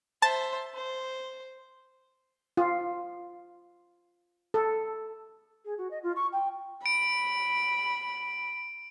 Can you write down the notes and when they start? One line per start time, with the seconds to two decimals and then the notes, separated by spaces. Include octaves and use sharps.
0.22 C5 E5 A5
0.74 C5
2.57 F4
4.54 A4
5.65 G#4
5.78 F#4
5.90 D#5
6.03 F4
6.15 C#6
6.32 G5
6.86 B5 D7